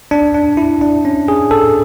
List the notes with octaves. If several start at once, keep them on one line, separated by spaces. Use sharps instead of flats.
D4
D4
E4
D4
C#4
G#4
A4